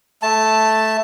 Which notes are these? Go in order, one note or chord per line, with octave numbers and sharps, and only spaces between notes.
A3 A5